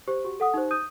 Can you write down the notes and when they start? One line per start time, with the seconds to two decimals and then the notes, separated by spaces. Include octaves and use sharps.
0.08 G4 C5
0.24 F#4 G4
0.40 A4 F#5 D#6
0.54 D#4 G4 C5
0.71 D#6 G6 D#7